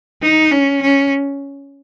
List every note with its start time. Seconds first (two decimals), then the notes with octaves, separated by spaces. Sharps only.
0.22 D#4
0.51 C#4
0.82 C#4